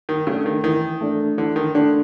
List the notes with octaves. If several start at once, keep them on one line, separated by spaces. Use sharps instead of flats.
D#3
C#3 A3 D4
D#3
D#3 E3
A3 D4
D3 E3
D#3
D3 A3 D4